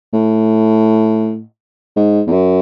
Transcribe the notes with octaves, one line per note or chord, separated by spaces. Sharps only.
A2
G#2
E2
F#2